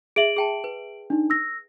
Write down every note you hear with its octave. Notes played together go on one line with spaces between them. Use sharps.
G#4 D#5 E5 D7 F#7
G#4 G5 A5
B4
D4 D#4
E6 A#6